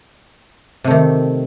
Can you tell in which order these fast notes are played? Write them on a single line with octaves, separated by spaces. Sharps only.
C3 A3 D#3